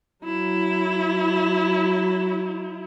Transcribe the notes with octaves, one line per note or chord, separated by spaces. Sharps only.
F#3 E4